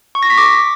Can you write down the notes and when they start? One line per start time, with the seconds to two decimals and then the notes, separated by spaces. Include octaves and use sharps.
0.15 C#6
0.23 A#6
0.30 B6
0.38 D6